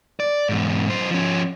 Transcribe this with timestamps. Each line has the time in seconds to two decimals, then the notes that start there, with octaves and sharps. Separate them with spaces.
0.20 D5
0.49 E2 G#2
0.89 F#2 C5
1.11 F3 C#4